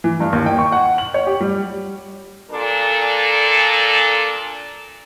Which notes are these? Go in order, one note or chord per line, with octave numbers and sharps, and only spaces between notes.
E3
G2
D#2
G5
C#6
F#5
F#7
C#5
G4
G3
A#2 D4 A4